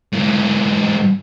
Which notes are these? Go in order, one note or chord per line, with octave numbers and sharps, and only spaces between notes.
G#2 E3